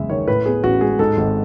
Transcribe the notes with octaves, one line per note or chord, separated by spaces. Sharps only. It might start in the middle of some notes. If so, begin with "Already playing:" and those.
Already playing: F#1 E2 G#3 E5
D#3 C#5
A2 B4
B3 G#4
A1 F#4
G#3 G#4
G#2 A4
G#1